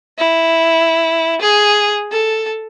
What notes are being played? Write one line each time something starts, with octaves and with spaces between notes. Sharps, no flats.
E4
G#4
A4